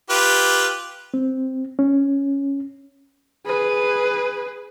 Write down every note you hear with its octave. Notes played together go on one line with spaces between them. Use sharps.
F4 G4 B4
C4
C#4
G#4 B4